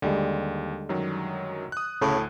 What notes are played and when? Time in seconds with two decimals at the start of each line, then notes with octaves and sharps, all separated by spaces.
0.02 D#2 D3 G3 G#3
0.89 F#2 D#3 F#3
1.72 D#6 F#6
2.01 D2 A2 C#3